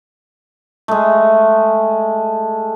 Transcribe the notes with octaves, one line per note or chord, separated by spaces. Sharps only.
G#3 A3